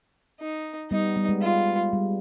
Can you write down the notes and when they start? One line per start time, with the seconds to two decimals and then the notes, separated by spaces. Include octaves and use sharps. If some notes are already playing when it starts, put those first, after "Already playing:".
0.41 D#4
0.91 G3 B3 D#4
1.16 G3 B3
1.29 G#3
1.42 F4
1.93 G3